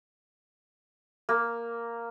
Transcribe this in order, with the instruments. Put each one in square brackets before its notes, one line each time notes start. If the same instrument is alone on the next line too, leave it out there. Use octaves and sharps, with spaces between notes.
[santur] A#3